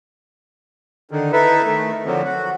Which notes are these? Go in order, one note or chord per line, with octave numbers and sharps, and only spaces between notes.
D3 D#3
D#4 E4 A4 B4 E5
D#3 A3
D3 F3 F#3 C4
F#4